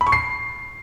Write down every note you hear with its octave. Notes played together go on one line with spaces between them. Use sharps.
B5
C#6
C7